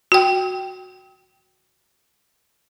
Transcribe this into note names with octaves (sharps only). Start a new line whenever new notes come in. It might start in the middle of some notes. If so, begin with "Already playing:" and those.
F#4 G5